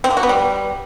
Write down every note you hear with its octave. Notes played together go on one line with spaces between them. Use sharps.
C4
A#3
F#4
B3
G3